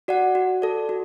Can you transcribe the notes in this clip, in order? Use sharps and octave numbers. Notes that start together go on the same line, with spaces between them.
F#4 D5 F#5
F#4
A4 D5
F#4